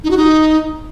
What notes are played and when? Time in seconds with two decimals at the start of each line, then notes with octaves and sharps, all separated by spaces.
0.04 D#4
0.11 F#4
0.17 D#4